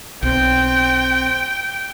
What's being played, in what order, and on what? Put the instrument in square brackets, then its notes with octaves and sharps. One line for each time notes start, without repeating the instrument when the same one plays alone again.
[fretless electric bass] B1 [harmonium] C4 [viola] G5